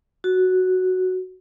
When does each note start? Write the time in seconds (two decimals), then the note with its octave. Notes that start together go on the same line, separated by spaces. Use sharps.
0.24 F#4